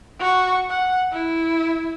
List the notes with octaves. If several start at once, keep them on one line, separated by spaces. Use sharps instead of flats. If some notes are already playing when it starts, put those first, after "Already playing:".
F#4 C#6
F#5
E4